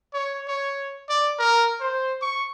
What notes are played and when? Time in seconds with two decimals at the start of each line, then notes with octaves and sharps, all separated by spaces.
0.13 C#5
0.48 C#5
1.09 D5
1.39 A#4
1.80 C5
2.21 C#6